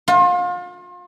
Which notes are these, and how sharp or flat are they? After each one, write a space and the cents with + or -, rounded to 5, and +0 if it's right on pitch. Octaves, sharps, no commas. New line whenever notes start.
F4 +35